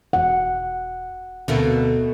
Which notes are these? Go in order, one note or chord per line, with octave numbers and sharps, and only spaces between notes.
E1 F#5
D2 B2 A3 A#3